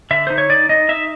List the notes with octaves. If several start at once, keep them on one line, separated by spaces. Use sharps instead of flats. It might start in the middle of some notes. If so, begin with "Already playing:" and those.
D3 E5
D#4 C5
C#5
D#4 D5
D#4 D#5
D#4 E5